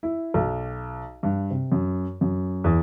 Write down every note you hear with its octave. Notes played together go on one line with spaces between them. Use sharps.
E4
B1
G2
C3
F#2
F#2
E2